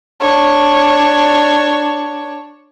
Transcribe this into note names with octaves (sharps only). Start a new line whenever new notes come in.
D4 C#5